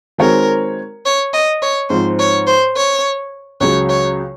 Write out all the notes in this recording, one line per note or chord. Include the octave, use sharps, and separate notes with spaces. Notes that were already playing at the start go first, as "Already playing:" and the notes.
D#3 G#3 C4 F#4 A#4 C#5
C#5
D#5
C#5
G#2 F3 C4 C5
C#5
C5
C#5
C#2 C#3 F#3 C#5
C#5